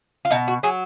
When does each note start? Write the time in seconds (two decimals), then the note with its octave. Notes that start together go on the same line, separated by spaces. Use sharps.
0.25 F4
0.30 B2 D#4
0.48 F#4
0.63 F#3 G#4